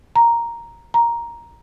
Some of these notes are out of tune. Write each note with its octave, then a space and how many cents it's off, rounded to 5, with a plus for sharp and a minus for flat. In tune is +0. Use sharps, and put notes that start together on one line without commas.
A#5 +0
A#5 +5